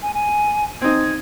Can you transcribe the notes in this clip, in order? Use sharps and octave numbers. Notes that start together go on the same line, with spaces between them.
G#5
G#5
C4 D#4 G#6